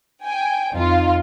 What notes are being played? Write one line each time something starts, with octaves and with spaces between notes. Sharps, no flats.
G5 G#5
F2 D#4 F4